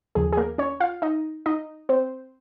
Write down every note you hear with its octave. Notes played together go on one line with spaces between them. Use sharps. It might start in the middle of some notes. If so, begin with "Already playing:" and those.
D#2 C#3 F3 G#4
G#4
A#3 A#4
C#4 C#5
F4 F5
D#4 D#5
D#4 D#5
C4 C5